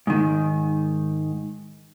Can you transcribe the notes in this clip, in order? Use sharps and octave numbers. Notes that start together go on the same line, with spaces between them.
G#2 D#3